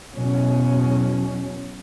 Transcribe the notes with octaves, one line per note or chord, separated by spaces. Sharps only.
E2 B2 F#3 C#4